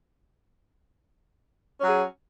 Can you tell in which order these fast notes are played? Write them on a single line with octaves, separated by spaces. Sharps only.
C#4 F#3 G#4